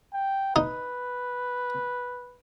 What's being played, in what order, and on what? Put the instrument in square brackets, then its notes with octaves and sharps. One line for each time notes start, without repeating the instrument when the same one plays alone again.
[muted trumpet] G5
[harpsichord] D#4 [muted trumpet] B4